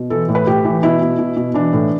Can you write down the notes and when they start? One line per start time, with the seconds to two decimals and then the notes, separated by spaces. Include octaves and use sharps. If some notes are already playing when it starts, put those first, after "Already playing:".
Already playing: B2
0.10 E3 A4
0.29 A2
0.35 B4
0.47 A2 G4
0.65 E3
0.83 B2 E4
1.01 B2
1.19 B2
1.37 B2
1.54 E3 D4
1.73 A2